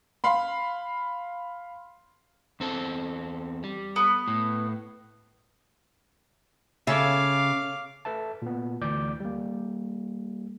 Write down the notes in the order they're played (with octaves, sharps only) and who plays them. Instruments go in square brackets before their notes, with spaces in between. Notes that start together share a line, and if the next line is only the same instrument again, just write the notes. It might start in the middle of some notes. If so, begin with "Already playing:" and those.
[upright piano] F5 B5 C6
[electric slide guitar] E2 C4 A4
G3
[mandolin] B3
[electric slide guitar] A2
[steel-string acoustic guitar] C#3 [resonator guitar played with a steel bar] A4 C#5 E5 [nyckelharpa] F5 D6
[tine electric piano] A4 B4 E5 A5
A#2 B3
D2 E3 D5 D6 G6
G3 A#3